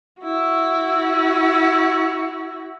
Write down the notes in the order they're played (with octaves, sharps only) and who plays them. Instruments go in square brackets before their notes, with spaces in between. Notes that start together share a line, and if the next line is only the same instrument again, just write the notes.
[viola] E4 F#4